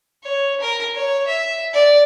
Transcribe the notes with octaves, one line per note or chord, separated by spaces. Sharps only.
C#5
A#4
C#5
E5
D5